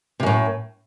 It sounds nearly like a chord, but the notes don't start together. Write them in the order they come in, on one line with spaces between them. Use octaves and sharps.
C3 F#2 A2